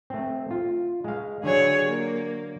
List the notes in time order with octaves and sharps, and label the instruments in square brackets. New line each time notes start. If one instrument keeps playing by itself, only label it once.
[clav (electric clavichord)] A3 C4
F4
G#3 F5
[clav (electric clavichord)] D3 F#3 [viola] G#4 C#5
[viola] A#3